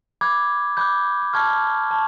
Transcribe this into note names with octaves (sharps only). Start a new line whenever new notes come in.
B5 D6 F#6 G#6
B5 D6 F#6 G6
G6
A5 C#6 F6 G#6
A5 C#6